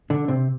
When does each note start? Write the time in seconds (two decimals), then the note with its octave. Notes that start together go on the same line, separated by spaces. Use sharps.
0.10 D3 D4
0.28 C3 C4